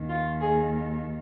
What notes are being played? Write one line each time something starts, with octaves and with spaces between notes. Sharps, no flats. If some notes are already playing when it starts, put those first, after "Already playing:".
Already playing: D#2 D#3
F4
G#4